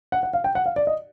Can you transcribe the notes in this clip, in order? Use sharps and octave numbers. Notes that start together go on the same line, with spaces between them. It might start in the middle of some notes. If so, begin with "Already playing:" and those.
F#5
F#5
F5
G5
F#5
F5
D5
D#5